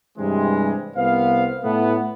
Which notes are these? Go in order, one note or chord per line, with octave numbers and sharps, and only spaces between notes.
G2 C3 E3 G3 G#3
C2 B3 C5 F5
A2 A3 B3